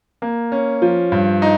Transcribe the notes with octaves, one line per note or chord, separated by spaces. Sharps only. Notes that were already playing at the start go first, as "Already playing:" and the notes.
A#3
C#4
F3
G2
D#4